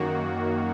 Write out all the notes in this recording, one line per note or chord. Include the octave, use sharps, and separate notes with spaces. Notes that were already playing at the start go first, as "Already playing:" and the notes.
Already playing: F#2 D#3 A#3 F#4